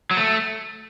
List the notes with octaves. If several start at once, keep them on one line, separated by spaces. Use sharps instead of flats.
F#3
A3